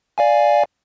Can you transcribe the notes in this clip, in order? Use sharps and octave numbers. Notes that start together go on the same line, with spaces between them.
D5 F5 G#5